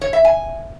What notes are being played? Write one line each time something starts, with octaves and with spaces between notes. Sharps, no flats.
C#5
E5
G#5